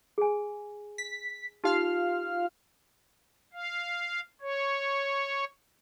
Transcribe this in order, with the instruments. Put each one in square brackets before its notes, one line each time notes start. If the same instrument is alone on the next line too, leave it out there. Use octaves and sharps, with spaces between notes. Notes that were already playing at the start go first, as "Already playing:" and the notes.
[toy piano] G#4 G#5
[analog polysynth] B6
[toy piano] D#4 G4 [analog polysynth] F4 F5 F6
[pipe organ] F5
C#5